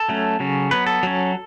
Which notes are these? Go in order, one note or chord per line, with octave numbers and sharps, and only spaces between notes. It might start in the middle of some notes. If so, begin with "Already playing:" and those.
Already playing: A4
F#3 A3 C#4
C#3 F#3 C#4
F#3 B3 B4
A4
F#3 C#4